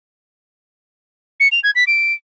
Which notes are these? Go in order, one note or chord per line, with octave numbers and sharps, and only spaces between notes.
C#7
F7
G#6
B6
D7